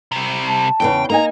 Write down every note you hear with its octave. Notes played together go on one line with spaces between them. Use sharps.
C3 G3
A5
E2 A2 C#3 G5
A#3 D#4 G#5 A#5